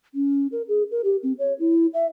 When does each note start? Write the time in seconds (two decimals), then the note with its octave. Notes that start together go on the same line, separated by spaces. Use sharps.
0.15 C#4
0.52 A#4
0.68 G#4
0.91 A#4
1.04 G4
1.23 C4
1.39 C#5
1.60 E4
1.94 E5